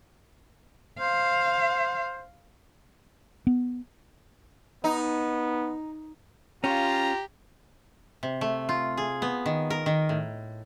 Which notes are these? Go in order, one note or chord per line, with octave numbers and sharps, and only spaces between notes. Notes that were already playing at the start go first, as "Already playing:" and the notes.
C5 F5
B3
B3 D#4
C#4 F4 G4 A#5
C3
A3
F4
G#4
B3
D#3
A#4
D#3
A2